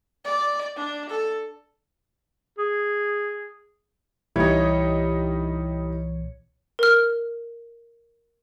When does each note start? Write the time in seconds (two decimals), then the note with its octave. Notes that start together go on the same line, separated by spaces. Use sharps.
0.25 D5
0.76 D4
1.09 A4
2.58 G#4
4.36 C2 A#2 E3 G3 D#4 E4 C#5
6.79 A#4 F6